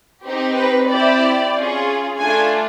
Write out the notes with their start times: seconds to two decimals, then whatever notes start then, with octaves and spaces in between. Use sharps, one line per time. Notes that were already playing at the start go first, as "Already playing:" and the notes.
0.25 C4 D#4 G4
0.56 B4
0.89 C4 E4 G4 D5
1.56 C#4 F4 G#4
2.20 A3 D4 F4 G#5